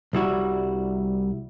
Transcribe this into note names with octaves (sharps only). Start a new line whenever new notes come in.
C2 G3 E4 F#4